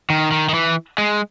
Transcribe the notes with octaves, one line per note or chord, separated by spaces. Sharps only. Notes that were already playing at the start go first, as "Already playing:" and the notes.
D#3
D#3
D#3
E3
G#3